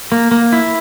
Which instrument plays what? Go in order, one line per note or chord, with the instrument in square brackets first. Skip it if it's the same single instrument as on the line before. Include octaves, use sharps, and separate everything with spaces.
[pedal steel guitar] A#3
A#3
E4